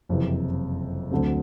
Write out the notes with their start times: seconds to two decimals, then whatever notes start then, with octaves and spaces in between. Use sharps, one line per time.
0.09 F#1 F2 C3 E3
1.11 D2 D3 F#3 A3 C4